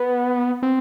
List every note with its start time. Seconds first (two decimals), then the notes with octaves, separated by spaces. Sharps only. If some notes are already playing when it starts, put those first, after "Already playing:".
Already playing: B3
0.63 C4